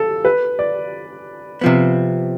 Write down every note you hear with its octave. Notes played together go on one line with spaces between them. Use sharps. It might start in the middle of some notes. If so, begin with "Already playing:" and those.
Already playing: A4
B4
D5
C3 F3 B3